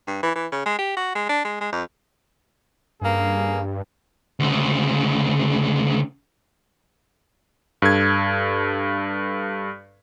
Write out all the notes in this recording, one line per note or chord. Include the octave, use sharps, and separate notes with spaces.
G2
E3
E3
C#3
G#3
G4
F#4
G#3
D4
G#3
G#3
F2
G2 C#3 A#3 G#4
D2 C#3
G2 A4 G#6